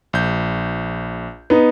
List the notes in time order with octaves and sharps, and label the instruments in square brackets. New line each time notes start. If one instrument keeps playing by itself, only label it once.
[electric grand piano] A#1 G6
[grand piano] B3 D#4